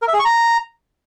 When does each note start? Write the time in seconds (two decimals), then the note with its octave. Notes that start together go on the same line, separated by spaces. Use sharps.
0.02 A#4
0.08 E5
0.13 G#4
0.19 C#6
0.25 A#5